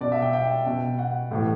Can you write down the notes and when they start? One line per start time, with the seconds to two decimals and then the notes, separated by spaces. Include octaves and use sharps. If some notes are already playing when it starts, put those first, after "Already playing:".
0.01 B2 D5
0.12 E5
0.22 G5
0.33 G5
0.66 B2
0.99 F#5
1.31 A2 E3